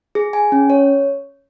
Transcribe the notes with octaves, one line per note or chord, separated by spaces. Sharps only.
G#4
G#5
C#4
C#5